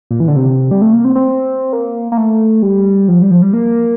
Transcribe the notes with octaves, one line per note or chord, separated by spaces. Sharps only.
A#2
E3
D3
C3
G3
A3
A#3
C4
C4
A#3
A#3
A3
G3
F3
G3
F3
G3
A#3